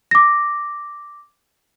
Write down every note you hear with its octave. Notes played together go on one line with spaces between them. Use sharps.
D6 A#6